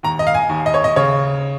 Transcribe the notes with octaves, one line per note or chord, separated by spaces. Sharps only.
D#2 A#5
D#5
F5
G#5
D#2
D#5
C#5
D#5
C#3 C#5